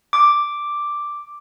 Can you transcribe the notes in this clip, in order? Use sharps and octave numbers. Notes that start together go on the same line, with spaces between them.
D6